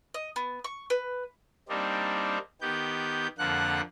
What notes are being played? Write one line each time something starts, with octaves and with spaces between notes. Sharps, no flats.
D#5
B3
C#6
B4
G3 A#3 C4 D4 D#4
D#3 B3 G4 G6
F2 D3 F3 A#3 F#5 F#6